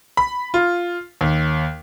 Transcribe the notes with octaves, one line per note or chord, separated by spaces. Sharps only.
B5
F4
D#2